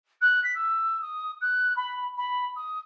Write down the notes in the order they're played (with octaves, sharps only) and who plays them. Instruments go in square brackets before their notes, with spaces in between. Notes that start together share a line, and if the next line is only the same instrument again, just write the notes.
[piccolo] F#6
B6
E6
D#6
F#6
B5
B5
D#6